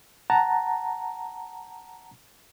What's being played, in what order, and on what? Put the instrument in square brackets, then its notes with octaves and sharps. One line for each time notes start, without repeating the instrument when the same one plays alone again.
[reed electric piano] F#5 A5 A#5